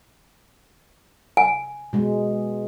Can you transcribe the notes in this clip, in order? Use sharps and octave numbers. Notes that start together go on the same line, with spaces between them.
G#5
B2 G#3